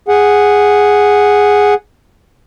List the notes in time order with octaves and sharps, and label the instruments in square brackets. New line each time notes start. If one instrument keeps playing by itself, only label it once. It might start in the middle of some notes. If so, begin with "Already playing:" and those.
[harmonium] G#4 F#5